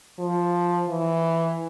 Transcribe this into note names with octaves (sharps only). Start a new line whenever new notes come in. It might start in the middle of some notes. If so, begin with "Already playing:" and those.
F3
E3